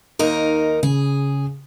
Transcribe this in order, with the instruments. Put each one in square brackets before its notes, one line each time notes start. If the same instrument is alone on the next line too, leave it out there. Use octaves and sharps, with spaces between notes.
[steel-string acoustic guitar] D#2 D#4 A#4
[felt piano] C#3 [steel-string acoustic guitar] G#4